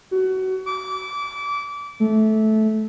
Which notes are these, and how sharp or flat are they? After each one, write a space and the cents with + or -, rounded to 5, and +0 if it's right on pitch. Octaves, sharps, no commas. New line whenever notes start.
F#4 +25
D6 -25
A3 -15